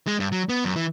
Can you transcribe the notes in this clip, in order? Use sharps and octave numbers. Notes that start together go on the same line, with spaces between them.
G#3
G2
F#3
B3
F#2
E3